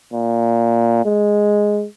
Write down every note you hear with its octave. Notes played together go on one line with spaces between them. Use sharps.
A#2
G#3